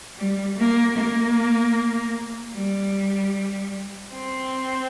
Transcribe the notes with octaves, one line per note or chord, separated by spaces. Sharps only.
G3
A#3
A#3
G3
C4